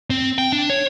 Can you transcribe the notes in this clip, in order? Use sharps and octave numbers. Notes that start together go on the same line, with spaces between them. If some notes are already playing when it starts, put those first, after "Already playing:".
C4
G5
D4
C#5